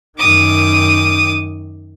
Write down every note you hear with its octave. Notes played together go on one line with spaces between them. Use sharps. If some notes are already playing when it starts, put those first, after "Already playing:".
F#2 D#3 D6 D#6